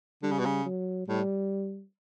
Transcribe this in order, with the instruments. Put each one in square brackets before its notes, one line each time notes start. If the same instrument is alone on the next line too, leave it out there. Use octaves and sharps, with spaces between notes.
[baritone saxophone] D3 [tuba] G3
[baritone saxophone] C#3
B2
C#3
[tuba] F#3
[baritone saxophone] A2 [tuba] G3